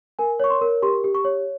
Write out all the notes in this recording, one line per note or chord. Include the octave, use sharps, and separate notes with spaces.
A#4 G#5
C#5 C#6
C6
A#4
G4 C6
G4
C#6
C#5